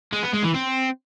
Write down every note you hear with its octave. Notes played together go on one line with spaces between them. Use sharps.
G#3
B3
G#3
E3
C4